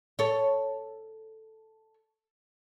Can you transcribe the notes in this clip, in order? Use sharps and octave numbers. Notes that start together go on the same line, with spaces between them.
A4 C#5